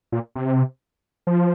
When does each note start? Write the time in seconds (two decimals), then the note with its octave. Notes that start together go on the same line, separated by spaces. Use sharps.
0.12 A#2
0.35 C3
1.27 F3